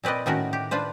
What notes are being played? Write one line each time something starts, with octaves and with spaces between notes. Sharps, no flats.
A#2 C4 B4 D5 D#5
A2 D#3 A3 C#4 F#4 A#4
G4
D4 F4 B4 C5